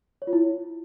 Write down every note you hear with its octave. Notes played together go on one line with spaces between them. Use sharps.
C#5
F4
E4